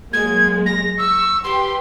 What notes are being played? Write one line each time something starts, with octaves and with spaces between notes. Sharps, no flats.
F#3 G#3 A#3 G#6
A#6
C#6 E6
G4 B4 C6